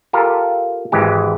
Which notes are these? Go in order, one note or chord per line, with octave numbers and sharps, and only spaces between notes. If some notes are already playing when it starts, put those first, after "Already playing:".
F4 G4 A4 A#4
G#1 E3 G#3 G4